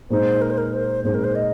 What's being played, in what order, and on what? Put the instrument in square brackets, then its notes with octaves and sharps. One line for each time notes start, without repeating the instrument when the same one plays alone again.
[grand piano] A#2 G#3 D#4 [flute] C5
[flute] A#4
C5
A#4
C5
[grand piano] A#2 G#3 D#4 [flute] C5
[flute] A#4
C5
D#5